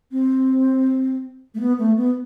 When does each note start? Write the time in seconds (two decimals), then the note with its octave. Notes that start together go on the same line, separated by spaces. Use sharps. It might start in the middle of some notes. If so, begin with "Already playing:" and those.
0.12 C4
1.54 A3
1.60 B3
1.79 A3
1.97 B3